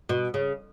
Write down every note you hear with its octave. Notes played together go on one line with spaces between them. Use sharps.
B2
C#3